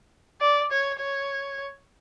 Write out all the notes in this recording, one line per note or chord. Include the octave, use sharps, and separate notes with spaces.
D5
C#5
C#5